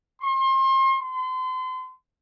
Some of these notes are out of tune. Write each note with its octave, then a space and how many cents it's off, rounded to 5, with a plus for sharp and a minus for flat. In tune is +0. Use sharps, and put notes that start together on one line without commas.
C6 +35
C6 -35